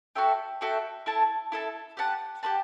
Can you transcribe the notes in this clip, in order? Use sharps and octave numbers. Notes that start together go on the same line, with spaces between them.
F#4 A4 E5 G5
F#4 A4 E5 G5
E4 A4 E5 A5
E4 A4 E5 A5
G4 B4 F#5 A5
G4 B4 F#5 A5